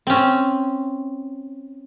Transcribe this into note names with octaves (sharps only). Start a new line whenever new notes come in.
C4 C#4